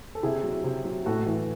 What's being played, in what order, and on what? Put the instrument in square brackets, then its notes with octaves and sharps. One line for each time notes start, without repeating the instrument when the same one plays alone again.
[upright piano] A4
C3 E4 G#4
F#3
C3
F#3
A2 F#4 A4
E3